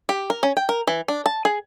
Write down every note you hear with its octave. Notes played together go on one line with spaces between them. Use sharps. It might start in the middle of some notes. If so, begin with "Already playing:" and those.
G4
A#4
C#4
G5
A#4
E3
D4
A5
G#4